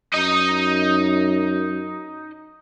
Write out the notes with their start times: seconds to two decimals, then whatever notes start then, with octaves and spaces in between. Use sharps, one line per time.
0.14 F#2 D#4 D#5